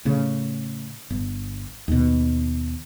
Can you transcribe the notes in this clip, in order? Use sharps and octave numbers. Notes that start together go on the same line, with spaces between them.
A2 C#3
G1
D#2 B2